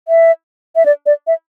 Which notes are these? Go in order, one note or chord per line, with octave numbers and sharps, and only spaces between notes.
E5
E5
D5
D5
E5